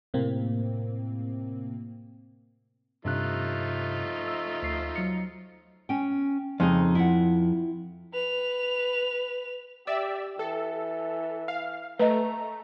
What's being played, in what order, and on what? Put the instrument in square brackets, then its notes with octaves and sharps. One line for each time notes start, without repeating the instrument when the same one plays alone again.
[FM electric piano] A2 C3 A#3 C4
[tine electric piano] G2 C3 F#6 [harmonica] F3 A3 D#4
[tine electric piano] E6
D2 C7
F#3 C#7
[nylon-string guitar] C#4 G5
[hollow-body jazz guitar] F2 [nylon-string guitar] C#3 D#4 G#4
[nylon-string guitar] E4 F4 F#5
[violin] B4 F7
[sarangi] G4 [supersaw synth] D5 E5 E6
[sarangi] E3 [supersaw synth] A4
[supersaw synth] F5
[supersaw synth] A3 [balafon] B4 D#5 [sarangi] A#5